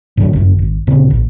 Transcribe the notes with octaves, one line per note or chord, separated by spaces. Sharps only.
G#2 D3 F3 F#3
G1 F#2
G#1
D2 A#2 C#3 C4
A1